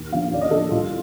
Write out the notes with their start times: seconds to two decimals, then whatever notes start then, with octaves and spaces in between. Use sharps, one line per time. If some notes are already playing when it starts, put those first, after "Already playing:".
Already playing: D#2
0.12 D3 F3 F5
0.31 D#2 D5
0.41 D#5
0.51 D3 F3 A4
0.71 C2 F4